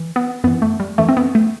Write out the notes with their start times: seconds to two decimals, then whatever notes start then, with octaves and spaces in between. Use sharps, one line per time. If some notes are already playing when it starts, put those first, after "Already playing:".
Already playing: E3
0.16 B3
0.44 F#2 E3 B3
0.62 A3
0.80 G3
0.98 F#2 E3 A3
1.09 C4
1.17 B3
1.35 A3